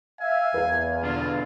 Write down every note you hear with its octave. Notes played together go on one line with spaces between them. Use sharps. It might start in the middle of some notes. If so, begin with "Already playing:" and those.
E5 F5 G#5
E2 B4 F5
B2 D3 D4 F4